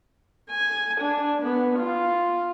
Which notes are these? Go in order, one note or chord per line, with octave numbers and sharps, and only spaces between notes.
G#5
D4
B3
F4